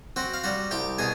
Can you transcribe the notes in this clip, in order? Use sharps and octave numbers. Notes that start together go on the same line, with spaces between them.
C4 F#4 F#5
F5
G3 F#4 F#5
C2 G4 G5
B2 G#4 G#5